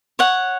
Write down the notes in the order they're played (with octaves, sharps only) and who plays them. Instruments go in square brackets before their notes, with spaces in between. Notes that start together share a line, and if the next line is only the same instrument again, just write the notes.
[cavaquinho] C#5 F#5